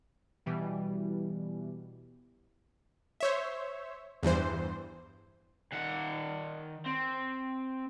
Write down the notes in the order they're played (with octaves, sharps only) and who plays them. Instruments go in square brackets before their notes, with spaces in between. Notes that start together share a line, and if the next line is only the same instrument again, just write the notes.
[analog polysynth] B2 E3 G3
[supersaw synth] C5 C#5 E5
E2 G2 E3 C5
[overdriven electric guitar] D#3 F#5
C4